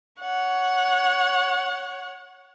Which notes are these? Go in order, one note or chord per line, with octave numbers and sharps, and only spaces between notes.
C#5 F#5